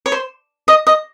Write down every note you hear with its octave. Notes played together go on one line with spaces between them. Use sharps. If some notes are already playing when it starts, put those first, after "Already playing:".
C#5
C5
D#5
D#5